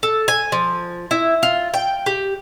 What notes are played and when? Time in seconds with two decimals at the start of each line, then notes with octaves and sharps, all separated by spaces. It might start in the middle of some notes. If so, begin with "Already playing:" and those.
0.03 A4
0.28 G#5
0.52 F3
1.11 E4
1.43 F4
1.74 G5
2.06 G4